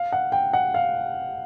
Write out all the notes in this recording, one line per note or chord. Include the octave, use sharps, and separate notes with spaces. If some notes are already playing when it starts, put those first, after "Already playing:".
Already playing: F5
F#5
G5
F#5
F5